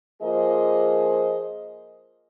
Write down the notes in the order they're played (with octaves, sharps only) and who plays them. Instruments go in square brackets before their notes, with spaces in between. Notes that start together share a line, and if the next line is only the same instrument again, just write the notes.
[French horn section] F3 A#3 F4 G#4 C5 D#5